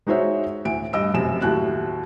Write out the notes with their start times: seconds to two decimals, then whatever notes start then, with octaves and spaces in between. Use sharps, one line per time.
0.07 G#3 D#4 F#4 C5 C#5 E5
0.65 D2 A2 D7
0.93 G2 D#5 E6 D7
1.14 F1 F#2 C3 E7
1.42 D#2 A2 F#4 F#6